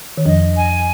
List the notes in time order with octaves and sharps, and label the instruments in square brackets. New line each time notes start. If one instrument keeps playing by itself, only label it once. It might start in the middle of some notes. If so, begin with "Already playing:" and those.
[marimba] D#3
[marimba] F2 F3 [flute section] D#5
[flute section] G#5